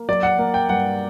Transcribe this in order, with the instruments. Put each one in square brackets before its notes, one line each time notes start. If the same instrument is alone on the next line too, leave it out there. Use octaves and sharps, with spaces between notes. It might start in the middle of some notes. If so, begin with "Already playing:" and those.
Already playing: [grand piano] A#3
F#3 D5
F#5
A#3
G5
G2 F#5